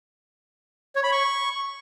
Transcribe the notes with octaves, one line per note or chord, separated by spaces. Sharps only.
C#5
B5
C#6